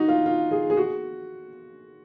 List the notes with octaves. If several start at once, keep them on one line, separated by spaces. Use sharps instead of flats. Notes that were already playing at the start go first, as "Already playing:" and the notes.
Already playing: D#4 F#4
F4
F4
G#4
G#4
F#4